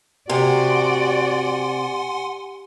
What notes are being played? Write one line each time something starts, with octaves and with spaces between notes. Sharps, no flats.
C3 F#4 D5 F#5 G#5 C6